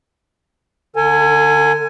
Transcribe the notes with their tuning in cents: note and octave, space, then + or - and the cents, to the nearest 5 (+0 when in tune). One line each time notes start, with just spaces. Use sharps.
D3 +0 A4 +45 G#5 +0